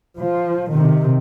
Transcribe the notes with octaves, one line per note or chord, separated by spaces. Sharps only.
F3
C3 D#3